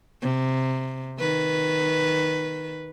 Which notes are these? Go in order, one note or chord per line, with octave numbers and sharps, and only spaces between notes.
C3
D#3 B4